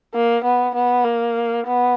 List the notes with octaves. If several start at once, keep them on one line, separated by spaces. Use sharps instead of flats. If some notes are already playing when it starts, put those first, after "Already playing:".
A#3
B3
B3
A#3
B3